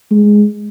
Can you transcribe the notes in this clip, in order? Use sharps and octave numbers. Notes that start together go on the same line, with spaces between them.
G#3